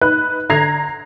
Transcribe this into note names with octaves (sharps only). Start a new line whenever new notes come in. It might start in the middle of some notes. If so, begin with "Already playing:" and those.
D#4 B4 F#6
D3 A#5 G#6 A#6 C7 F7